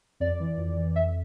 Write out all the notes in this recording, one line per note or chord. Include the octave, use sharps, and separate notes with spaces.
F2 D5
E3
F2
E3
F2 E5